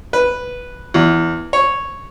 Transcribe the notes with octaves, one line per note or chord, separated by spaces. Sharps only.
B4
E2
C#5